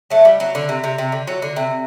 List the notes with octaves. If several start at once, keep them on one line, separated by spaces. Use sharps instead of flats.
F#3 A3
G3
F#3
D3
C3
C3
C3
D3
F#3
D3
C3